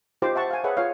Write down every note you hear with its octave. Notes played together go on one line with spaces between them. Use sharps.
D#4 F4 G4 C5 D6
E5 F#5 A5 C#6
F5 G#5
G#4 B4 C#5 E5 F#5
F4 C#5 F5